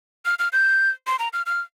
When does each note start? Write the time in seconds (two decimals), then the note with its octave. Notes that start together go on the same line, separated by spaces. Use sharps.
0.25 F6
0.39 F6
0.53 G6
1.07 C6
1.19 A#5
1.33 F6
1.46 F6